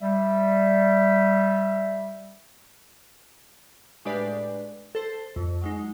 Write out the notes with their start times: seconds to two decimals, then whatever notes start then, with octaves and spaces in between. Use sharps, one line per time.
0.01 G3 E5
4.05 A2 G#3 D4 G4 B4 D5
4.95 A4 C5
5.36 F2
5.61 F#3 G#3 D#4